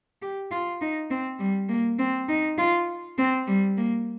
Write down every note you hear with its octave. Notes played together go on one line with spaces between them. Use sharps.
G4
F4
D#4
C4
G3
A#3
C4
D#4
F4
C4
G3
A#3